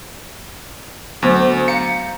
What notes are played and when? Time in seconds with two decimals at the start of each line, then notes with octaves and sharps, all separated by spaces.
1.22 D2 F#3 B3 C5
1.68 F5 A#5 G6 C#7